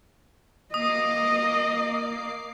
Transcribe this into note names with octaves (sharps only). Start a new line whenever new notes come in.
A#3 D#5 D6 D#6 C7